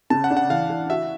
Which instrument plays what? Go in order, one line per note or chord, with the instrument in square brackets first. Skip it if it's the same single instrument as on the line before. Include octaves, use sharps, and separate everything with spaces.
[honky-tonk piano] C#3 [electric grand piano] A5
[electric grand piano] F#5
[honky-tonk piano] D4
[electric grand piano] F#5
[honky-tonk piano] E3 [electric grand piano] F5
[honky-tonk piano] E3
[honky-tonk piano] F#4 [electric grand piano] E5